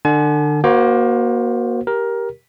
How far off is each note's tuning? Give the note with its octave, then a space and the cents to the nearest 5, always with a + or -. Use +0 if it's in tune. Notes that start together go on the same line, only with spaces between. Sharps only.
D3 +30 G#5 +45
A#3 +30 F#4 +0 C5 +0
G4 +0 A#4 +15